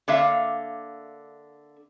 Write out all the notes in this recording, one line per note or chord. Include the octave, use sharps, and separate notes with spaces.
D3 A#3 E5 F5